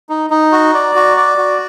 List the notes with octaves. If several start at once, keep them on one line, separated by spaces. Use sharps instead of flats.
D#4
D#4
F#4
D5
F#4
D5
F#4